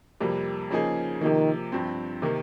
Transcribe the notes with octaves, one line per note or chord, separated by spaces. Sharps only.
F2 C3 G3 A#3
C#3 F3 A#3 D#4 G#4
C3 D#3 F3 A#3
G2 F3 C4
C3 D#3 A#3